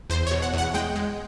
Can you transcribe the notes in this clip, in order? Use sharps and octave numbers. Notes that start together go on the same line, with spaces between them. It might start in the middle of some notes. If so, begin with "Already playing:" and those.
E2 C5
B2 C#5
F#5
E2 F#5
G#3 G5
G#3